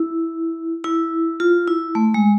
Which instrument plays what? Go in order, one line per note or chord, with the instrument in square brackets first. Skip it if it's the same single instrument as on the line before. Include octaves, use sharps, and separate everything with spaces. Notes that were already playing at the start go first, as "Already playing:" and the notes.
Already playing: [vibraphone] E4
E4
F4
E4
A3
G#3